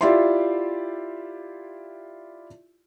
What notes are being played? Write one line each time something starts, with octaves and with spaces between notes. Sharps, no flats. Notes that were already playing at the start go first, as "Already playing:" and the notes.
E4 F4 G4 D5 E5 C6